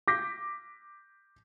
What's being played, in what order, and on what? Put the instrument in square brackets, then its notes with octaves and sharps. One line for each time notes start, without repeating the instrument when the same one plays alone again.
[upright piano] D6 G6 A#6 B6